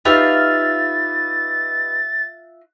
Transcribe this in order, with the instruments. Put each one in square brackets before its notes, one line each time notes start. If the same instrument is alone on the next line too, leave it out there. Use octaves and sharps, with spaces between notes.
[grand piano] D#4 G4 B4 [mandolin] F4 E5 F5 [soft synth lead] A6